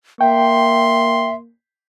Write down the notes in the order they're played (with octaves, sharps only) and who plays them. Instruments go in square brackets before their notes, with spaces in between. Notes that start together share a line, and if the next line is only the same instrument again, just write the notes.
[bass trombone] A#3 [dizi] E5 [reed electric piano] G5 [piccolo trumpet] C6